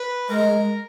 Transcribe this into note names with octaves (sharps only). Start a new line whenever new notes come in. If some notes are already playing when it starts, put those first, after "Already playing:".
Already playing: B4
G#3 A#4